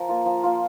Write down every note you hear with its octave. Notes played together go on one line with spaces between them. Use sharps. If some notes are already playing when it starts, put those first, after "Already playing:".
Already playing: F3 A#4
A#3 F4
F3
A#3 F4